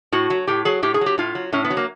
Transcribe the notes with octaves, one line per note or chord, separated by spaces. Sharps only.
A2 F#4
F#3
A2 G4
F#3 G#4
A2 G4
G#4
F#3
G4
A2 F4
F#3
A2 C#4
B3
F#3
A#3